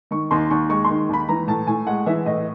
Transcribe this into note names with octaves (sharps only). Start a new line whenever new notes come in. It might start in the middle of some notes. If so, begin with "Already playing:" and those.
D#3 C#6
D#2 C6
D#2 C#6
G#3 C#6
D#3 C6
D#2 B5
E3 A#5
A2 A5
A2 G#5
G#3 F#5
E3 E5
A2 D#5